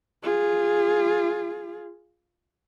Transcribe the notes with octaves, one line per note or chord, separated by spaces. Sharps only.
F4 G#4